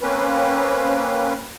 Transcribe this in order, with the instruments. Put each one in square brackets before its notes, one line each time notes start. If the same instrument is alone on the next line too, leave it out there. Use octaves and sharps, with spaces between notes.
[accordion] A#3 C4 C#4 B4